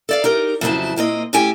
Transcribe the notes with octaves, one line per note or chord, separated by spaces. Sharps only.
A4 D5 F5
D#4 G4 A#4
F2 C#3 F#3 E4 C5 A5
A#2 A#3 C4 D#5
A2 C#4 G4 A4 G5 G#5